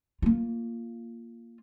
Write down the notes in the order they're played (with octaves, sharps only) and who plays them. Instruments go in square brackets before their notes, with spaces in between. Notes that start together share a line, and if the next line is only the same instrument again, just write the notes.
[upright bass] A#3 F4